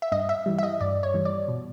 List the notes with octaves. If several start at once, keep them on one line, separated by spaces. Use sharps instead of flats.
E5
G2 D#5
E5
E3 G3
E5
D#5
G2 D5
C#5
E3 G3
D5
B2